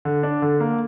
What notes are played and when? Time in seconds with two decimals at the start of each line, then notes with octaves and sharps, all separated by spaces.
0.05 D3
0.23 D4
0.42 D3
0.60 A#3